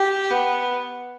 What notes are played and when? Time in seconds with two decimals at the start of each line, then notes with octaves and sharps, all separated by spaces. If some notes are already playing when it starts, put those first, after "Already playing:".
Already playing: G4
0.31 B3